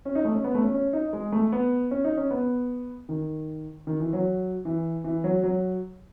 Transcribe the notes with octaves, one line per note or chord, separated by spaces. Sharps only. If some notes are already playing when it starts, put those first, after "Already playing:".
C#4
D#4
A3
C#4
B3
A3
C#4
C#4
D#4
G#3
A3
B3
C#4
D#4
C#4
B3
D#3
D#3
E3
F#3
E3
E3
F#3
F#3